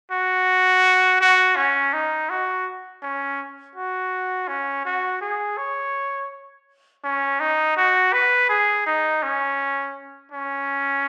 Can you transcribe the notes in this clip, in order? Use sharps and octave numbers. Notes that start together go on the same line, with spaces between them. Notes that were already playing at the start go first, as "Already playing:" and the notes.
F#4
F#4
C#4
D#4
F#4
C#4
F#4
C#4
F#4
G#4
C#5
C#4
D#4
F#4
B4
G#4
D#4
C#4
C#4